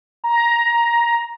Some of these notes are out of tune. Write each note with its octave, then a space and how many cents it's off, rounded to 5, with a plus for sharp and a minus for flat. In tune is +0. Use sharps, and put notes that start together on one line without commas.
A#5 +10